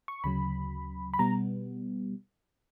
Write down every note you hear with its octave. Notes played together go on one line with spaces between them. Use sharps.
C#6
D2 C#3 F#3 B5
B5
B2 G3 B3 A#5